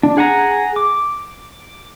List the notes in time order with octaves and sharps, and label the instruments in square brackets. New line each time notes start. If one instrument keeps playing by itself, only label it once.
[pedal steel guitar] D4
G#4 F#5 G#5 A#5
D6